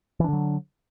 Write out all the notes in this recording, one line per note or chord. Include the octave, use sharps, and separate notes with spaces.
D3 E3 F#3 D4